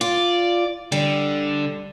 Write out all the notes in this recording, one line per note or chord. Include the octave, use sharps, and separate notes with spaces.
F4 D5
D3 G3